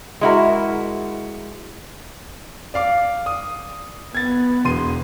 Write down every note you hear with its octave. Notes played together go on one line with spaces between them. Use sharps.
G#3 E4 F#4 A#4
D5 F5 D6
D#6
B3 G#6 A6
E1 C6 D#7